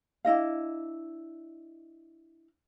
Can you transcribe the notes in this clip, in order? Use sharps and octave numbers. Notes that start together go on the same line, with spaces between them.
D4 E4 D#5 F5